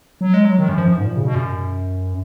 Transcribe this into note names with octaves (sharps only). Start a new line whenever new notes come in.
F#3
G#3
F#3
D#3
F#2
F3
F#2
G#2
A#2
C#3
B2
F#2